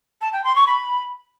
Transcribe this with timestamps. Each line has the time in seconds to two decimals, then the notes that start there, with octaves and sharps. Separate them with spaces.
0.21 A5
0.32 G5
0.44 C6
0.55 C#6
0.66 B5